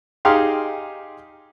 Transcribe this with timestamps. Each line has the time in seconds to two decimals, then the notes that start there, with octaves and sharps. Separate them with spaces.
0.25 D#4 G4 G#4 F5 C6